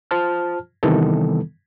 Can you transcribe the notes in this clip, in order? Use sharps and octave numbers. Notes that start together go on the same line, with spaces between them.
F4 C5 A5 F6
C3 D#3 E3 G3 B3 A4